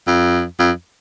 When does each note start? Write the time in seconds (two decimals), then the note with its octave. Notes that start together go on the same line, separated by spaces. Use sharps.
0.07 F2
0.59 F2